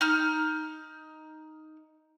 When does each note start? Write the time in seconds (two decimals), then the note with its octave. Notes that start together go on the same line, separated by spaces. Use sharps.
0.01 D#4 F6